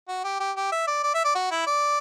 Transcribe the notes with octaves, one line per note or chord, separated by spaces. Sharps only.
F#4
G4
G4
G4
E5
D5
D5
E5
D5
F#4
E4
D5